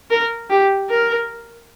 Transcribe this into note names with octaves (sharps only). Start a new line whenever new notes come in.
A#4
G4
A#4